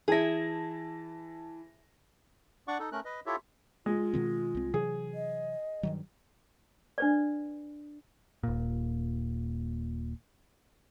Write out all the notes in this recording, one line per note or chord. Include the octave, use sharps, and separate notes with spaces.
E3 E4 G#4 A5 A#6
D4 D5 F#5 C#6 D6
D#4 A4
A3 C#4 A#4 F#6
B4 D#5
E4 F4 G4 A4 C#5 E5
G#3 F4
B2 D#3 C4
C2 C4
C3 E3 F#3 G#4
D#5
G2 D#3 F#3
D4 B4 D5
D#1 A#2